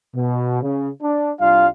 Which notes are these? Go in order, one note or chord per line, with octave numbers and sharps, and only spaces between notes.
B2
C#3
D4
C2 G3 D4 F4 F5